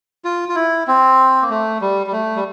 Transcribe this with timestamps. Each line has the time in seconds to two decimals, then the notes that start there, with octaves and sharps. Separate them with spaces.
0.25 F4
0.49 F4
0.55 E4
0.87 C4
1.42 A#3
1.50 A3
1.81 G3
2.07 G3
2.12 A3
2.36 G3